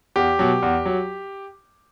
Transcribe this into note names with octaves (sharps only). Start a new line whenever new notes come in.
E2 G4
B2 F#3
E2
F#3